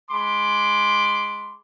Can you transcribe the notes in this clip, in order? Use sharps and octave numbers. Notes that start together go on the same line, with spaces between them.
G#3 B5 C6 D6